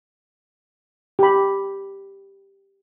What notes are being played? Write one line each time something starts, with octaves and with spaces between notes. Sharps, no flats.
G4 B5